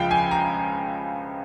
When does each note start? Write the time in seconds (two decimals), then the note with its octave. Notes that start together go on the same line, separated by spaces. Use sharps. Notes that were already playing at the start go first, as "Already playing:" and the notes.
Already playing: C#2 C#3 F3 F5 G5
0.11 G#5
0.31 A#5